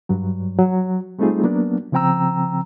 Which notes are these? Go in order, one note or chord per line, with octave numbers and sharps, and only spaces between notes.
G2 F#3
F#3
G3 A3 C4 D#4 F4 G#4
F#3 A#3 B3 D4
C#3 F3 C4 G5 A#5 E6